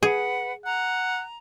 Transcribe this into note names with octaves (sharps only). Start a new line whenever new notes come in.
G#4 B4 F#5
F#5 A#5